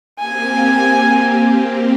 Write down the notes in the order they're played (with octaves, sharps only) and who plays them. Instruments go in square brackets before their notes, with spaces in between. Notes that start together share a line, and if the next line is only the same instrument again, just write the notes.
[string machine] A#3 C4 G4 [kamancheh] G#5